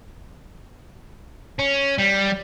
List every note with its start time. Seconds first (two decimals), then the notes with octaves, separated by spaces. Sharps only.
1.59 C#4
1.98 G3